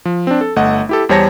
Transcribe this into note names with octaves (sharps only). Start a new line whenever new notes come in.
F3
C4 D4
A4
G1 A3 D#5 F#5
E4 G4 A4
E2 G3 C5 C#5 A5 A#6